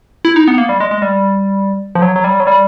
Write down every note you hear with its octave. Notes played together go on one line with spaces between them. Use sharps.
E4
D#4
B3
A#3
G3
G#3
G#3
G3
F3
F#3
F#3
G3
F#3
G3